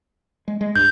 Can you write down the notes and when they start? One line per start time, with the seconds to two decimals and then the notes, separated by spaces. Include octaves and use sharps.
0.48 G#3
0.61 G#3
0.76 C#2 G2 G6